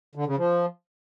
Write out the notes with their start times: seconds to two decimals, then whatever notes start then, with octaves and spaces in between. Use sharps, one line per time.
0.15 D3
0.26 C#3
0.37 F3